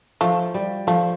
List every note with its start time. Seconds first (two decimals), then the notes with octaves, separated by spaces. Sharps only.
0.21 F3 A3
0.54 G3
0.87 F3 A3